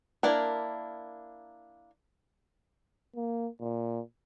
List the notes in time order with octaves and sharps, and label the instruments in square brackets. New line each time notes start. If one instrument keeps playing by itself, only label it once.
[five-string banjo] A#3 D4 E4 A#4
[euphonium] A#3
A#2